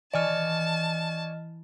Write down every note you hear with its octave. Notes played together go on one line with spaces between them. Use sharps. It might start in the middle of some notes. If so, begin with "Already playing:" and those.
E3 D5 D#5 G#5 A5 C#6 F6